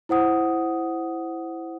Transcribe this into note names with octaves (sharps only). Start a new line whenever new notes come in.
E4 C5 F#5 D#6